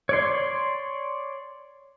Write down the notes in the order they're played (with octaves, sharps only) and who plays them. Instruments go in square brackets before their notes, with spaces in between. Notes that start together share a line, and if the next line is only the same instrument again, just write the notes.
[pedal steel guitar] C#5 D5 C6